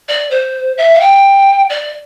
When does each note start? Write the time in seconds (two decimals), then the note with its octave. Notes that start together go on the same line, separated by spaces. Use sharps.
0.08 D5
0.30 C5
0.77 E5
0.94 F5
1.00 G5
1.69 D5